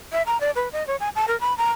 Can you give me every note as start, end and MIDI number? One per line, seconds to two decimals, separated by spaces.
0.13 0.22 76
0.26 0.40 82
0.41 0.51 74
0.56 0.69 71
0.73 0.86 75
0.87 0.96 73
1.00 1.09 80
1.15 1.26 81
1.28 1.39 70
1.41 1.56 83
1.58 1.70 82